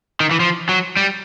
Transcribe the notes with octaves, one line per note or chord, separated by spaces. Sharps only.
D#3
E3
F3
F#3
G3